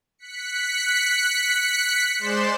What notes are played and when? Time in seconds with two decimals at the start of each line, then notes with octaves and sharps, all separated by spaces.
0.18 F#6 B6 C#7
2.19 G#3 C5 D5 C6 E7